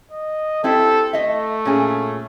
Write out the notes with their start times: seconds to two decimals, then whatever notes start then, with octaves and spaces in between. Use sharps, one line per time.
0.12 D#5
0.64 C4 E4 G4 A4
1.13 A3 D#5 E5
1.65 A#2 C#4 G#4